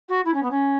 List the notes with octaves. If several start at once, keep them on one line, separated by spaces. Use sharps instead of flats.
F#4
E4
C#4
B3
C#4